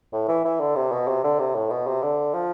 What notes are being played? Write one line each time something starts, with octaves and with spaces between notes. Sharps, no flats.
A2
E3
E3
D3
C3
B2
C3
D3
C3
A2
B2
C3
D3
F3